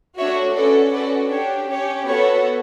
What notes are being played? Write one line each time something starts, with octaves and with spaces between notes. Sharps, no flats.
A3 D4 F#4 C#5 E5
C#4 F#4 A4 B4 D5
C#4 F#4 A4 B4 D5
D4 G4 C#5
C#4 G4 C#5
B3 F#4 A4 C#5